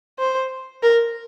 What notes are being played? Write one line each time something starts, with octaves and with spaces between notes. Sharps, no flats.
C5
A#4